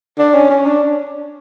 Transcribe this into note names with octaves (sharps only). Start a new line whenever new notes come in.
D4
C#4
C#4
D4